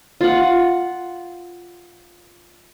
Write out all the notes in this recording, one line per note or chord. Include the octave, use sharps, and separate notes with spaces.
F4 F#5